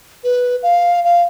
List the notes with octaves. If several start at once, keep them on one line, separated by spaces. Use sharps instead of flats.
B4
F5
F5